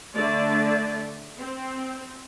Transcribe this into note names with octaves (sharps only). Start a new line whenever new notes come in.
D3 A3 D5
C4